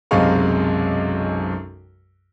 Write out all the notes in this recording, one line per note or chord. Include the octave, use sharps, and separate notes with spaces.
B1 F#2 C3 G#3 F5 C#6